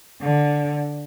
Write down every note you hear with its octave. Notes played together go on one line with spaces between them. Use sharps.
D3